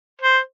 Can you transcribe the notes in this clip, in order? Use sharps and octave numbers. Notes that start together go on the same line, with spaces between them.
C5